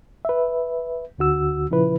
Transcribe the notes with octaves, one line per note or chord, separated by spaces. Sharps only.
B4 E5
D2 D3 F#4 E6
A#2 C#3 F3 E4 B4